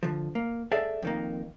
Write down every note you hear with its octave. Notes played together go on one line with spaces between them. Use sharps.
D3 F3
A#3
G#4 A4 D5 E5
F2 D#3 A#3